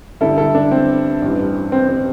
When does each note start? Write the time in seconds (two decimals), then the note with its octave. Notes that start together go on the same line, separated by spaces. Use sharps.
0.21 G1 G2 D3 G3 E4 A4
0.38 E4 A4
0.55 D4
0.71 C4
1.22 A1 G2 E3
1.72 C4
1.89 C4